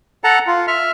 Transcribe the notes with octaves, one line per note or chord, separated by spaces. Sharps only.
A4 F#5 A5 A#5
F4
E5 F6